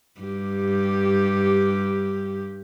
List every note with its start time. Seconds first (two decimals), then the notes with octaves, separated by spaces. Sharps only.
0.21 G2 G4